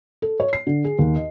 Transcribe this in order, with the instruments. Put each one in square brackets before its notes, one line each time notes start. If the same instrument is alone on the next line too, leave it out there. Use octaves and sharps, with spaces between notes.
[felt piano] A4
C#5
C7
D3
G#4
D#2
D#5